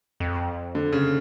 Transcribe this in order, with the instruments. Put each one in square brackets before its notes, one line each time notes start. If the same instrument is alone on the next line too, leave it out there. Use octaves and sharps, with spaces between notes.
[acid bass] F2
[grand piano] D3
C#3